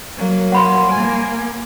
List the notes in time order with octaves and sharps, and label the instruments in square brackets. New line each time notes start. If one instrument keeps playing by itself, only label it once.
[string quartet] F#3 A#3
[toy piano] F#5 B5 C6
[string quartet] A#3 G#5